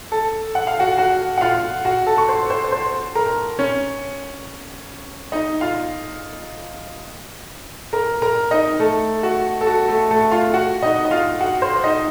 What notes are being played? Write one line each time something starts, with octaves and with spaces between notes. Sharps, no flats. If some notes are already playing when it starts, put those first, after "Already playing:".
A4 A5
F#5
F5
F#4 F#5
F#4 F#5
F#5
F4 F5
F#4 F#5
A4 A5
C#6
C5 C6
C5 C6
C5 C6
A#4 A#5
C#4 C#5
D#4 D#5
F4 F5
A#4 A#5
A#4 A#5
D#4 D#5
A3 A4
F#4
A4
F#4
A3 A4
A3 A4
F4 F5
F#4 F#5
D#4 D#5
D#5
F4 F5
F#4 F#5
C5 C6
D#4 D#5